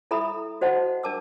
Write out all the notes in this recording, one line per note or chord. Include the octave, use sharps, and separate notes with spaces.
E4 A4 E5 A#5 B5 D#6
F#4 C5 D#5 F#5 A5
D4 A#4 A5 D6 E6